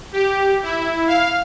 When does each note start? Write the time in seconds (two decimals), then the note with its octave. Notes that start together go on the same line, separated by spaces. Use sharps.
0.13 G4
0.63 E4
1.07 F5